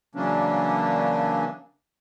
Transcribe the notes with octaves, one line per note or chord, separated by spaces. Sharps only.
C#3 E3 F#3 A#3 C#4 D4